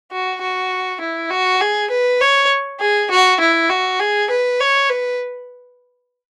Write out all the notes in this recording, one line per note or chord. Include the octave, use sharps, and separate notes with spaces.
F#4
F#4
E4
F#4
G#4
B4
C#5
G#4
F#4
E4
F#4
G#4
B4
C#5
B4